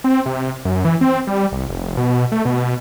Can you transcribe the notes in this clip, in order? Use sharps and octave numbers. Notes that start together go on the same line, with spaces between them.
C4
C3
F#2
E3
C4
G3
C2
F1
B2
A3
B2